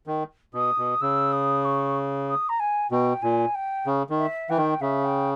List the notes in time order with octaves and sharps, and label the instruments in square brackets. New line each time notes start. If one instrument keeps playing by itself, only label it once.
[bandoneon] D#3
[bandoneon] B2 [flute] D#6
[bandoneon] B2
[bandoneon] C#3 [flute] E6
[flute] D#6
C#6
D#6
A#5
G#5
[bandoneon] B2 [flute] G5
[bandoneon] A#2 [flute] G#5
[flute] G5
[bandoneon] C#3
D#3
[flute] E5
[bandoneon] E3 [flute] G5
[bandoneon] D#3
[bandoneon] C#3 [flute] E5
[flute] G5